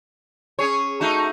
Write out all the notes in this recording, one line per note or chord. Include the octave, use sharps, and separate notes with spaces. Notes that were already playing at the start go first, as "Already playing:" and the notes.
C#4 G#4 C#5
A3 D#4 F#4